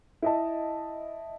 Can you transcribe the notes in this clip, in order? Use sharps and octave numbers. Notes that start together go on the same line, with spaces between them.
E4 D#5 A5